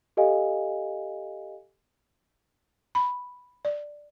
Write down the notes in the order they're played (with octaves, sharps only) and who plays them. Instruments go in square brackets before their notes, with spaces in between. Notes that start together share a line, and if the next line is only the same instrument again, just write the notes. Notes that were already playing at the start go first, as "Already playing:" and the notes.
[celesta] G4 A4 D#5 F5 G#5
[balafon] B5
D5